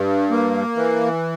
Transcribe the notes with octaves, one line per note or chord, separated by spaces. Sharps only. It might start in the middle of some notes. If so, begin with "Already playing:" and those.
Already playing: G2
A#3
E3